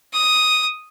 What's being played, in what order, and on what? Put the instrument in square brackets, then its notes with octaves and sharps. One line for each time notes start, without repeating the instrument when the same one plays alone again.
[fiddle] D#6